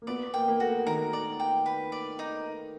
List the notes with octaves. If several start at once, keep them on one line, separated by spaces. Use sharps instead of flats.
A#3
B3 D5
A#3 G5
A#3
A3 F#4
D#3 A#4
D5
G5
B4
D5
D#4